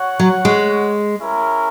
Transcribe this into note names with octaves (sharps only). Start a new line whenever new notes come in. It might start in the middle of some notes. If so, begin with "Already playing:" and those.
Already playing: F#4 C#5 F#5
F#3
G#3
C#4 E4 A#4